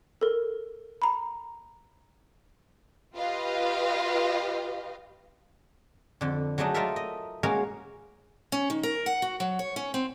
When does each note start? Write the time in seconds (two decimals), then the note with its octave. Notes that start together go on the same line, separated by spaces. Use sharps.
0.21 A4 A#4
1.02 A#5 B5
3.15 F4 G4 B4 D#5 F5
6.21 F2 D3
6.58 F#3 G#3 A3 D4 D#4
6.74 A3 D#4 F4 A4 A#4 E5
6.96 D#5
7.43 G#3 A#3 C#4 F#4 A#4 F5
8.52 C#4
8.70 D#3
8.83 A#4
9.06 F#5
9.22 F#4
9.40 F#3
9.59 C#5
9.76 C#4
9.94 C4